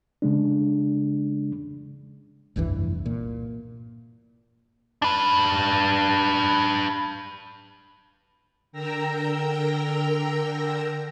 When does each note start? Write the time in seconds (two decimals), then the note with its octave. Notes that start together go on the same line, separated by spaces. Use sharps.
0.22 C#3 G#3 D4
2.56 F1 C2 G2 E3
3.06 A#2
5.02 D4 B4
8.72 D3 A#4 G5 A#5 E6 A#6